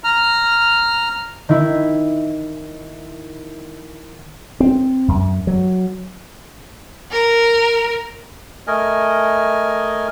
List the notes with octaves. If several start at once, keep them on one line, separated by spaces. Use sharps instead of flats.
A#5 F6
D#3 E4
C4
F#2
F#3
A#4
A3 A#4 D#5 G#5